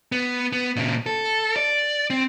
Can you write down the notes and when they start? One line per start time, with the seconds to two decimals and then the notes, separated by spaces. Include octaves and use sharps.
0.12 B3
0.53 B3
0.76 A#2 C#3
1.06 A4
1.56 D5
2.10 C4